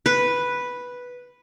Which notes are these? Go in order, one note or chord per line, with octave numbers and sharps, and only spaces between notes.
B4